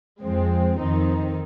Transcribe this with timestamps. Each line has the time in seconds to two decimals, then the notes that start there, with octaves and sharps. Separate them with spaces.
0.22 F2 F3 G#3 C4
0.79 F2 D#3 C4 D#4